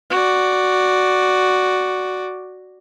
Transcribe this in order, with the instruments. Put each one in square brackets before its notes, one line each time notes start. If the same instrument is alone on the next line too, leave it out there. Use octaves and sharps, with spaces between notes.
[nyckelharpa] F#4 D5